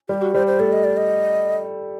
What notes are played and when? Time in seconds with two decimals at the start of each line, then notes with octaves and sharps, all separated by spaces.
0.09 G3 G4
0.22 F#4
0.34 G3 C5
0.47 C5
0.59 A3 D5
0.72 D#5
0.84 D5
0.97 D#5